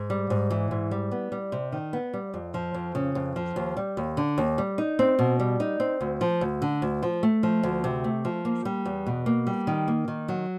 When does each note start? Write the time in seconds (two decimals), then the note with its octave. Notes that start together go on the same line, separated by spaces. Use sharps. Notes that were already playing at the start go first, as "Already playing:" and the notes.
Already playing: G#2
0.10 G3
0.30 G#2
0.50 E3
0.71 G#2
0.91 G3
1.11 B3
1.32 G3
1.52 C3
1.72 D#3
1.93 B3
2.14 G3
2.34 F2
2.54 F3
2.74 F2
2.95 C#3
3.15 F2
3.36 F3
3.56 D#2
3.77 G3
3.97 D#2
4.17 D3
4.38 D#2
4.58 G3
4.78 D#4
4.99 C4
5.19 B2
5.40 G3
5.60 D#4
5.80 C4
6.01 D2
6.21 F3
6.41 D2
6.62 D3
6.82 D2
7.03 F3
7.23 A3
7.43 F3
7.63 D2
7.84 C3
8.04 A3
8.25 F3
8.45 A#3
8.65 G3
8.85 E2
9.07 B2
9.26 A#3
9.47 G3
9.67 D#3
9.88 A#3
10.08 D#3
10.28 F#3